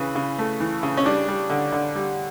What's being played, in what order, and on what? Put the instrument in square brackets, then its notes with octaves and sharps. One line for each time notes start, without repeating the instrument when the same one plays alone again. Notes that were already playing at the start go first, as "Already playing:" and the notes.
Already playing: [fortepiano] C#3 E3 B4
C#3
A3
E3
C#3
C#4
G3 D4
G3
D3
D3
G3